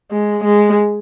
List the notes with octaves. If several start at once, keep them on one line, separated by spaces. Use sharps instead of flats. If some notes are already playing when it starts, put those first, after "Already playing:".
G#3
G#3